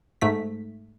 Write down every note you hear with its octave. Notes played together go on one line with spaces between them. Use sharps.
G#2 A3 B6